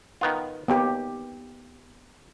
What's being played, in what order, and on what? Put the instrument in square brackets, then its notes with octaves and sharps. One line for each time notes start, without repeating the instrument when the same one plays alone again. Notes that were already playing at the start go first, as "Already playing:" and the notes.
[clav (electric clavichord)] D#3 B3 F4
[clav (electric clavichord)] D#2 [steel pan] B3 G4